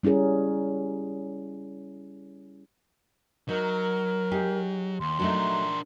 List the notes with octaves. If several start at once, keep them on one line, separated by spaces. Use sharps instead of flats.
G3 C#4 E4 G#4 A#4
F#3 D#4 A#4
D#4 G4 G#4
D#2 C6
F#3 A3 D4 D#4 A#4